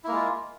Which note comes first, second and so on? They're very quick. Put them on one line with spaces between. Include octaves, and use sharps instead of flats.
E4 A#3 G#3 F4